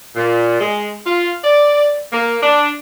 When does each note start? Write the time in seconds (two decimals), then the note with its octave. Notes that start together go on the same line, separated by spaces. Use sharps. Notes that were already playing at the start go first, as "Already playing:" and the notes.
0.16 A#2
0.61 G#3
1.07 F4
1.44 D5
2.13 A#3
2.43 D4